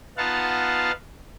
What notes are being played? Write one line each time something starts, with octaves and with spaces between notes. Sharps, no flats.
B3 D#4 F4 F5 F#5 A5